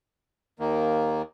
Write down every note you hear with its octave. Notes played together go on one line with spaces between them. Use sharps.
D#2 D#3 A#3